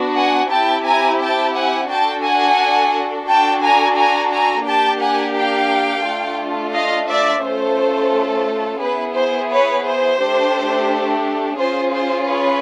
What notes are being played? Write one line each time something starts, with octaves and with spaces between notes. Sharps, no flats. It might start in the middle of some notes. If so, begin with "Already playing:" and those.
Already playing: B3 D4 F#4
F#5 G#5
C4 E4 G4 G5 A5
G#5 A#5
G5 A5
F#5 G#5
D4 F#4 A4 G5 A5
F#5 G#5
D4 F#4 A4 G5 A5
G#5 A#5
G#5 A#5
G#5 A#5
A#3 D4 G4 G5 A5
F#5 G#5
F5 G5
A3 D4 F4
D#5 F5
D5 E5
A3 C#4 F4 A4 C5
B3 E4 G#4 B4
C5
B4 C#5
C5
A3 D4 G4
C#4 F4 G#4 C5
C5
B4 C#5